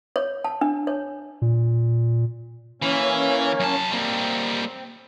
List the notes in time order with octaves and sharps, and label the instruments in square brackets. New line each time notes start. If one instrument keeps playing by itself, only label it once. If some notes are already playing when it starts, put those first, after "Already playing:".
[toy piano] C#5
A5
D4
C#5
[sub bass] A#2
[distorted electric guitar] E3 [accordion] A#3 C#4
[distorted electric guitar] F#2 A5
[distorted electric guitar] G3 A#3 [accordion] C4